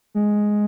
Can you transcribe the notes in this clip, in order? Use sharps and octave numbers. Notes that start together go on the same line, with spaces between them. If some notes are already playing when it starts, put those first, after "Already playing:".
G#3